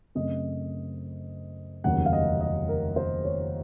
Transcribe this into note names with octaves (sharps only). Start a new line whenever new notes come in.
F#2 C#3 A3 C4 D#5
F1 D#2 C#3 F#3 F#5
F5
D#5
D#5
A#4
C5
C#5